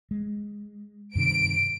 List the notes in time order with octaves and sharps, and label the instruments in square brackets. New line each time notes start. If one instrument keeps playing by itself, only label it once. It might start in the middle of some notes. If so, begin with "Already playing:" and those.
[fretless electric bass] G#3
[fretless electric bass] G2 C3 D#3 [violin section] D7